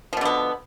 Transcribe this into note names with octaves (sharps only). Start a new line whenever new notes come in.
B2 D3 F3 B3